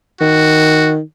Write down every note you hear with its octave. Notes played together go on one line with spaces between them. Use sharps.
D#3 F#4